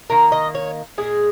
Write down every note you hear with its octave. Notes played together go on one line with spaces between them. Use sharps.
D#3 A#3 A#4
D#5
C#5
A#2 G#3 G#4